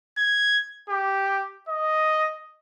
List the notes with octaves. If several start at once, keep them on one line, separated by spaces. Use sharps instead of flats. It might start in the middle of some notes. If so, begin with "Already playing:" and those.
G#6
G4
D#5